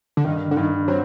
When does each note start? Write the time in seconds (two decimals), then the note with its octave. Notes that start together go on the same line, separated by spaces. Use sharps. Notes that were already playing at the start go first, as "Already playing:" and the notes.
0.17 D3
0.24 G2 D#3
0.51 D3
0.56 G2 D#3
0.88 F#3 C4